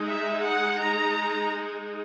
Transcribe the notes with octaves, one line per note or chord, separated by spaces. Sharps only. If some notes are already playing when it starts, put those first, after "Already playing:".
Already playing: G#3 D#4
E5
F#5
A#5